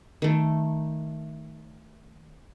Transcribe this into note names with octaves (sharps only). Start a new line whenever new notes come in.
D#3 A3